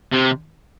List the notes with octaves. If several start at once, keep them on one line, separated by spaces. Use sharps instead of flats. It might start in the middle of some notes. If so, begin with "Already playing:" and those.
C3